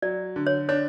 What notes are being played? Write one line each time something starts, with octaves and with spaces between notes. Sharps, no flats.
F#3 D5
D3
C#5
D4 C#5